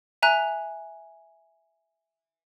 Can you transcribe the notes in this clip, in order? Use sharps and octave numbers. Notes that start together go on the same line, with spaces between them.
E5 G#5 A#5 F#6